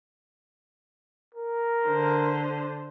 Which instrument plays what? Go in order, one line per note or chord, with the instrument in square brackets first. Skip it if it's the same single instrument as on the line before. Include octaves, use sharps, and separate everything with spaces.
[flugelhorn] A#4
[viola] D3 C5